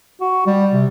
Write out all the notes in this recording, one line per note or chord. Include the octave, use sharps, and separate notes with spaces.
F#4
G3
C3